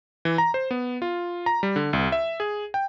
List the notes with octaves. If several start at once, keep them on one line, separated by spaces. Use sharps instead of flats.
E3
A#5
C5
B3
F4
A#5
G3
D3
C2
E5
G#4
G5